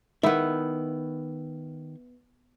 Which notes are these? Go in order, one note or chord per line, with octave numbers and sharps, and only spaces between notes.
D#3 B3 E4